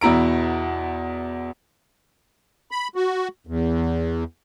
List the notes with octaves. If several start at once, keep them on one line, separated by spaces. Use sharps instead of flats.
E2 B2 E4 A#5 D7
B5
F#4
E2